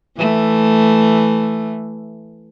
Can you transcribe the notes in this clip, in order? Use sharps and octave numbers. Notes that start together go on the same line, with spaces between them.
E3 A3